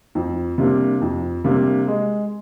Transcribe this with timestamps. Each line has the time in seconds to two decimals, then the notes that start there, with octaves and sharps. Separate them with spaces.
0.15 F2
0.58 C3 G3 A#3 D4
1.01 F2
1.44 C3 G3 A#3 D4
1.88 G#3